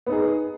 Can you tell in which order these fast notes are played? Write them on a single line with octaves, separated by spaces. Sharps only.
B3 D#4 G#4